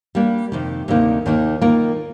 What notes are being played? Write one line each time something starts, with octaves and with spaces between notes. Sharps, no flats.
G3 A#3 D4
F2 C3 D#3
D2 C3 D#3 A#3 D#4
D#2 D#3 A#3 D#4
D#3 A#3 F4 A#4